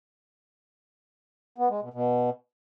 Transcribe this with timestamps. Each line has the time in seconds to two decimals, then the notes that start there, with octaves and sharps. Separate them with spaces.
1.58 B3
1.70 G#3
1.82 B2
1.94 B2